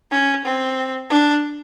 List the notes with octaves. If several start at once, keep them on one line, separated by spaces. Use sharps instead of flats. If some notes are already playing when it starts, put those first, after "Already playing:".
C#4
C4
D4